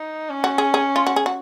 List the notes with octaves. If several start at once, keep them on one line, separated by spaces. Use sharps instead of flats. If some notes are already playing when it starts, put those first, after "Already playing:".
Already playing: D#4
C#4
F#4
G#4
G#4
F4
F#4
G#4
F#4